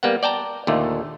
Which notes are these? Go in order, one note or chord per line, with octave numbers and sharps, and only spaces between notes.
G3 A#3 B3 F#5
D5 G5 A5 A#5
D#2 A#2 D3 A3